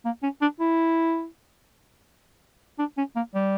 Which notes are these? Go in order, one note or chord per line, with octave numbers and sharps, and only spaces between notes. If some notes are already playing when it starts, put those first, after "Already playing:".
A#3
C#4
D4
E4
D4
C#4
A#3
G3